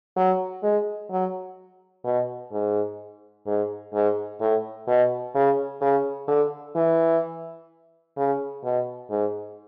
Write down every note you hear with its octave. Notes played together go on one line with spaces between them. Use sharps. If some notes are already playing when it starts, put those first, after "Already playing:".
F#3
G#3
F#3
B2
G#2
G#2
G#2
A2
B2
C#3
C#3
D3
E3
C#3
B2
G#2